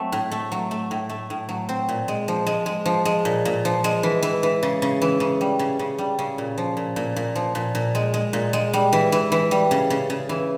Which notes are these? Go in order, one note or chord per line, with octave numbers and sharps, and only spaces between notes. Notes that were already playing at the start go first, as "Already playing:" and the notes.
Already playing: F#3 A3 C4
A2
A3
F#3
A3
A2
A3
A2
F#3
C4
A#2
G#3
F3
G#3
G#3
F3
G#3
A#2
A#2
F3
G#3
E3
E3
E3
C#3
C#3
E3
C#3
G3
C#3
C#3
G3
C#3
A#2
F3
A#2
A#2
A#2
F3
A#2
A#2
G#3
G#3
A#2
G#3
G3
E3
E3
E3
G3
C#3
C#3
C#3
E3